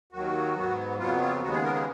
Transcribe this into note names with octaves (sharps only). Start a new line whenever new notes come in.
D#2 D#3 F#3 F#4
G#2 F#3 B3
F2 C#3 F#3 B3 F4
F4
D#2 C#3 G#3 B3 F#4
G#4
A#4
G#4